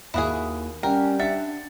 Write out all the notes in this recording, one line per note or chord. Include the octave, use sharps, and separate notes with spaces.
D#2 E4 F#4 G#4 D#6
G3 C#4 A#4 F#5 G5
D4 E5 F#5 A6 C#7